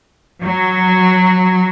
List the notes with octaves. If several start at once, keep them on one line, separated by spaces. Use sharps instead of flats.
F#3